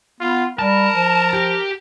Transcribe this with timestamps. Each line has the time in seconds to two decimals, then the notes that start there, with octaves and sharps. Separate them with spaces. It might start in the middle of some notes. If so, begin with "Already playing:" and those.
0.20 B3 F4
0.59 G3 A#4 A5
0.94 F3
1.33 G4